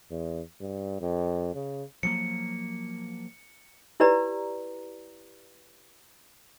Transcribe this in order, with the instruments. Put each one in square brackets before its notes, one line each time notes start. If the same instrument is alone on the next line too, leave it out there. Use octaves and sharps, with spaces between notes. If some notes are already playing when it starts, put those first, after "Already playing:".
[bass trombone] E2
G2
F2
C#3
[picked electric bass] F3 F#3 A#3 [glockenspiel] C#7
[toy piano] E4 G4 B4 D5 A#5